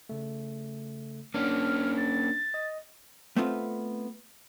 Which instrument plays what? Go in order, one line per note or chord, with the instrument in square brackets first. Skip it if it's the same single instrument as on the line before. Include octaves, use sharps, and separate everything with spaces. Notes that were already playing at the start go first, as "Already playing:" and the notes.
[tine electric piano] C#3 A3
[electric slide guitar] A#3 C#4 [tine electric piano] D4 [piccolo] F6
[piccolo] A6
[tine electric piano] D#5
[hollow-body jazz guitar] A3 B3 C4 F4